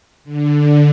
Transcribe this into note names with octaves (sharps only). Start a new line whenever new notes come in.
D3